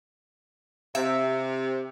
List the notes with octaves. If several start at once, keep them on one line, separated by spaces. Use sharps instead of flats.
C3 E5